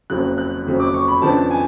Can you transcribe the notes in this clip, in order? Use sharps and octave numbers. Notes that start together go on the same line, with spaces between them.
F#1 F2 C#3 F#3 F#6
F#6
F#1 F2 C#3 F#3
D6
C#6
B5
F2 C#3 F3 B3 D4 A5
G#5